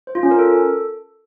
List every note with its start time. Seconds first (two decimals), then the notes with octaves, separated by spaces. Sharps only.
0.07 C5
0.15 F4
0.23 C#4
0.31 A#4
0.39 A4